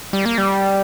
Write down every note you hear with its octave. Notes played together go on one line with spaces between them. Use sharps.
G3
A#3
G3